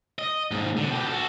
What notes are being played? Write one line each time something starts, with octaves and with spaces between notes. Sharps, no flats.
D#5
D#2 G#2
C2 D3
B2 G4
F#4 A4